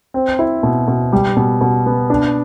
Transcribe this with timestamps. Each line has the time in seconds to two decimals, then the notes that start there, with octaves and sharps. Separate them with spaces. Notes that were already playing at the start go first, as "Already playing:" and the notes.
0.14 C4
0.39 E4
0.63 B2
0.87 B2
1.13 G3
1.36 B2
1.61 B2
1.86 B3
2.10 D4